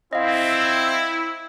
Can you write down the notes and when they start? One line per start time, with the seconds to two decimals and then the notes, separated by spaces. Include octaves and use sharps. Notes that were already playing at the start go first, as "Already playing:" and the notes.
0.13 C4 E4 D#5 F5